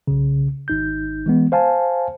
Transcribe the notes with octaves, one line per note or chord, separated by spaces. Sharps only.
B1 C#3
G#1 D#4 G6
E3 G#3 B3
C5 F5 G#5 A5